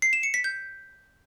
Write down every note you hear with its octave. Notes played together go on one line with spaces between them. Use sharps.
C7
E7
C#7
B6
G6